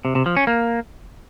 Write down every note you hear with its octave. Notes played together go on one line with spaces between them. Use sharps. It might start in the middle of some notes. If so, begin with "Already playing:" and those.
C3
C3
F3
C#4
A#3